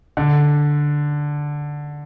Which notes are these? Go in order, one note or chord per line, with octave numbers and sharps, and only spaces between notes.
D3